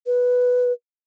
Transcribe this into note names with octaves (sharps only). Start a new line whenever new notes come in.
B4